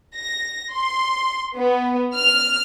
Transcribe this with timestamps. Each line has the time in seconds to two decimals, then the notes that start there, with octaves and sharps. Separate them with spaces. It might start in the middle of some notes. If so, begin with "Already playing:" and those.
0.14 A#6
0.71 C6
1.56 B3
2.15 F6